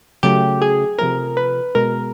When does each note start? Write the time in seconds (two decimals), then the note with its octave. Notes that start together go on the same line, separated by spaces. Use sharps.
0.23 C#3 F#3 A3 G4
0.62 G#4
0.99 C3 F3 A3 A#4
1.37 B4
1.75 B2 G#3 A#4